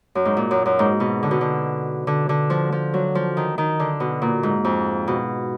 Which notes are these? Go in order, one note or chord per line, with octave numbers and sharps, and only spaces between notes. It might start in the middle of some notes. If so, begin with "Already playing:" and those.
F#2
G#2
A#2
F#2
F#2
G#2
B2
D3
B2
D3
D3
D3
F3
F3
F#3
F3
D#3
D#3
D3
B2
A#2
G#2
F2
B2